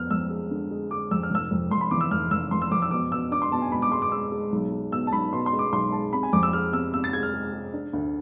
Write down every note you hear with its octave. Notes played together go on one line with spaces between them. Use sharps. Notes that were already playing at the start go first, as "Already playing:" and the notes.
Already playing: F2 B3 F6
F2 E6
G#3
D3
G#3
G#3 D6
F2 E6
F6
F1 E6
F2
F2 C6
B5
E3 D6
E6
F1 F6
F1 E6
F1 C6
E6
F2 D6
E6
B2 D6
B2 E6
D4 D6
C6
B2 A5
G#5
B2 B5
D6
G#3 C6
D6
G#3 E6
G#3
B1
G#3
B2 E6
A5
B1 B5
B2 C6
C6
G#3
D6
B1 C6
G#3 A5
C3 B5
G#5
F2 D6
E6
G#3 F6
C3 E6
C3 E6
A6
G#3 G#6
F6
G#3
G#3
D4
D2